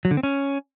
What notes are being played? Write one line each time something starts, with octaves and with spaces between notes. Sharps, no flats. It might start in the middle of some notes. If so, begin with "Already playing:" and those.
F#3
D3
C4
C#4